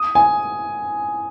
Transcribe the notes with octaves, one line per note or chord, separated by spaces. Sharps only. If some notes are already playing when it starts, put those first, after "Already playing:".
Already playing: D#6
G#5